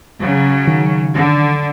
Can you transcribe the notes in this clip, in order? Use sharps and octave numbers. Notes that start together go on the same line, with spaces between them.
C#3 F#3
D#3
D3